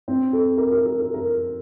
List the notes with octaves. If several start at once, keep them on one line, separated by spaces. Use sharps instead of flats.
C4
A4
A#4
A#4
A#4
A#4
A#4